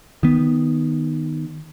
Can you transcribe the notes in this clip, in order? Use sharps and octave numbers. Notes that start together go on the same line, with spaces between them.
D#3 B3